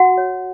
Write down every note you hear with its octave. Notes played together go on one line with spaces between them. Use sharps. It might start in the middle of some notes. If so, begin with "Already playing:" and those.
Already playing: F#4 F#5
C#5